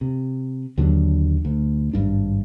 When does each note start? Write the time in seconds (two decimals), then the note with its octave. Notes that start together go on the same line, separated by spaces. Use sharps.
0.01 C3
0.77 D#2 D3 F#3 D4
1.45 D2
1.93 G#1 G2 D4